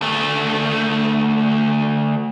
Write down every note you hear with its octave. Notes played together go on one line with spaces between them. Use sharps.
D2 A3